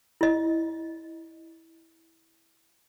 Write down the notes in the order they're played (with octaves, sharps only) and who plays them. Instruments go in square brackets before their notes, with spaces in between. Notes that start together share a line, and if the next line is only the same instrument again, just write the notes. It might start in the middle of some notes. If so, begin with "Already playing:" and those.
[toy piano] E4 D#5